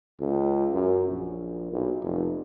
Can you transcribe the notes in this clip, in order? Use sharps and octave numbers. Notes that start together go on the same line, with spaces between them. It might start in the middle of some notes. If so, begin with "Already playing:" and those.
C#2
F#2
A#1
B1
F1